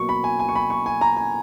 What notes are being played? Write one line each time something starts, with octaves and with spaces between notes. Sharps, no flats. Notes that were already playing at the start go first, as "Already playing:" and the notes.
Already playing: B2 F#3 A#3 C#6
B5
G#5
G#5
C#6
B5
C#6
G#5
A#5
G#5